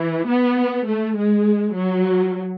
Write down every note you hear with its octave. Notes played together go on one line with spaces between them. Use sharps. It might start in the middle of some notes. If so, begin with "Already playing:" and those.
Already playing: E3
B3
A3
G#3
F#3